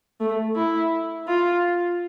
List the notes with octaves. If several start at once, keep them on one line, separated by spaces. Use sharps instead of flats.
A3
E4
F4